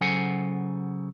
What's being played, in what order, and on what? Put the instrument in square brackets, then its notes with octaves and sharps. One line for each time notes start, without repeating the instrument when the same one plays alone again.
[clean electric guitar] C#3 F#3 A4 C5 F#5 G#5